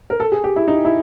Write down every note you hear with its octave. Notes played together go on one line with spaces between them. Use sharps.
A#4
A4
G#4
G4
E4
D#4
E4